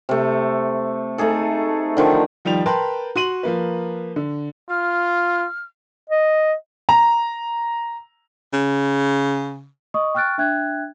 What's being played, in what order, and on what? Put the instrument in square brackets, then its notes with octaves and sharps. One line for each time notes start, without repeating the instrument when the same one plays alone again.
[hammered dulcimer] C3 A3
A3 D#4 G#4 A4
D3 D#3 F3
[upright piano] D#3 F3 G3 G5 F7
A#4 B4 G5 A5 B5 C6
F#4 C6 D#7 F#7
F3 A#3 B4
D3
[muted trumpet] F4 [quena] F6
[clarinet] D#5
[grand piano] A#5
[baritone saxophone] C#3
[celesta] D#5 C#6 D#6
G5 C#6 F6 F#6 A6 D7
D4 E5 G5 F#6 G#6